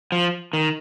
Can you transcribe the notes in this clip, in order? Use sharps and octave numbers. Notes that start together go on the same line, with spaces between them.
F3
D#3